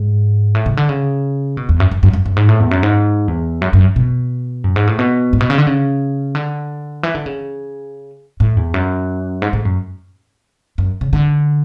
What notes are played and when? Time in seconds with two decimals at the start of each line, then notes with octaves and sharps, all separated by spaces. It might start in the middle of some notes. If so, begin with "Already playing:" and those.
Already playing: G#2
0.55 A2
0.66 C#3
0.77 D3
0.89 C#3
1.57 B2
1.69 E2
1.80 F#2
1.91 F#2
2.03 F#2
2.13 F#2
2.26 F#2
2.36 G#2
2.49 A2
2.60 E2
2.71 F#2
2.83 G#2
3.28 E2
3.61 F#2
3.73 F#2
3.96 B2
4.64 F#2
4.76 G#2
4.87 A2
4.99 B2
5.33 A2
5.41 B2
5.50 C#3
5.58 D3
5.67 C#3
6.35 D3
7.03 E3
7.15 D3
7.26 C#3
8.40 A2
8.57 E2
8.74 F#2
9.42 G#2
9.53 A2
9.65 F#2
10.78 F#2
11.01 C#3
11.13 D3